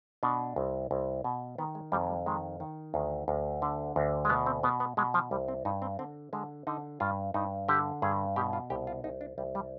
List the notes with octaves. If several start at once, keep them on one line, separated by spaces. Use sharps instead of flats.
B2 D4
C2
C2
B2
D#3 B3
G#3
F2 G3
G3
D#3 G#3
D#3
D2
D2
D3
D2
G#3
B2 B3
C4
B2 B3
B3
B2 G#3
F3
C2 G3
C4
G2 D#4
C4
D3 C4
D3 G#3
D3 D#4
G2 F4
G2 D#4
D3 G4
G2 G#4
B2 G4
F4
C2 G4
F4
C2 D#4
D4
C2 G3
G3